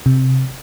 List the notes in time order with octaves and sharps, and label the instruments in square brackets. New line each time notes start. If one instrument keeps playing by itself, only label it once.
[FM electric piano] C3